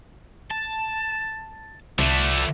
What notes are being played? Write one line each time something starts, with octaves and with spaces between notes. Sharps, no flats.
A5
C2 D3 F3 A3 E5